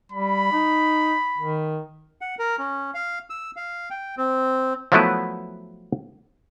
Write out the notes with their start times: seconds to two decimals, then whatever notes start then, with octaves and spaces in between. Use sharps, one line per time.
0.12 G3 B5
0.52 D#4
1.38 D#3
2.21 F#5
2.39 A#4
2.58 C#4
2.94 F5
3.30 E6
3.56 F5
3.90 G5
4.17 C4
4.92 F3 F#3 A3 B3 E4 B4